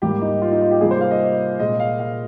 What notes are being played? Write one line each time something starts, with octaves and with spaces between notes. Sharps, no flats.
G#2 G3 A#3 G4
D#4
F4
D#4
F4
G4
C3 G3 A#3 G#4
C5
F5
D#5
A#2 G#3 D#5
F5
F5